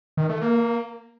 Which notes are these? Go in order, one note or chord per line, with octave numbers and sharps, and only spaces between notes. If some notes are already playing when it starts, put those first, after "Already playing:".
D#3
A3
A#3